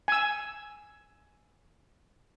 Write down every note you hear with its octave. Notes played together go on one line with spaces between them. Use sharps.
G#5 E6